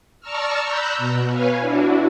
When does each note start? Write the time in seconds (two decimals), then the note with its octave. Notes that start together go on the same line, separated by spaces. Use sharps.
0.21 D5 A5 A#5 C#6 E6 F6
0.63 A#5 B5 E6 F#6 G6
0.98 B2
1.30 B4 C#5 F5 G#5
1.59 D4 E4 F#4